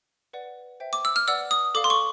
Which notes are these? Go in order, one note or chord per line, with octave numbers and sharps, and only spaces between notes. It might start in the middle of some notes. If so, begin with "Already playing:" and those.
B4 D5 F#5
C5 E5 G5
D6
E6
F6
B4 D5 F#5 E6
D#6
A4 D5 F5 D6
C6
C#6